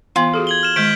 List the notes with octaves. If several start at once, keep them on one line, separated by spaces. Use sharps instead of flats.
E3 B3 F4
F#4 G#4 A4
G#6 F#7 G7
F6 E7
D#3 G#3 G6 B6 D7